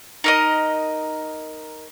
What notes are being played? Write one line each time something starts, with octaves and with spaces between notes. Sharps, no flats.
D#4 A#4 D#5